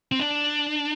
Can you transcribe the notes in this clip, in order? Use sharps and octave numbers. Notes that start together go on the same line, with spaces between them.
C4
D4